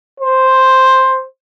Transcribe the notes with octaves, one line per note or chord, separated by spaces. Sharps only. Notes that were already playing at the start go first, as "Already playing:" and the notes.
C5